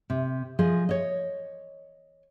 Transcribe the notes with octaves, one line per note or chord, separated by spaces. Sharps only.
C3
F3 G#4 D#5
C#5 D#5